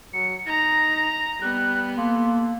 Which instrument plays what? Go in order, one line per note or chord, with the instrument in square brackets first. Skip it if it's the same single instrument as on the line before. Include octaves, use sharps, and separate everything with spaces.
[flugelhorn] F#3 [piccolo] C#7
[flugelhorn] D#4 [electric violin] A#5 [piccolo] A#6
[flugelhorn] G3 [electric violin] B3 [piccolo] F#6
[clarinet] A#3 [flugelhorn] A4 [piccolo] C6